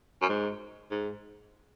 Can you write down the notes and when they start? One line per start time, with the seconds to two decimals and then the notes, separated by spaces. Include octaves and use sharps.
0.22 F#2
0.29 G#2
0.91 G#2